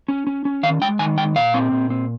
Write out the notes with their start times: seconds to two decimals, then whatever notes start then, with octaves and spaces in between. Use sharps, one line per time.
0.08 C#4
0.27 C#4
0.45 C#4
0.63 D#3 F5
0.81 G#3 G5
0.99 D#3 G#5
1.18 G#3 G5
1.36 A#2 F5
1.54 C4
1.72 A#2
1.90 C4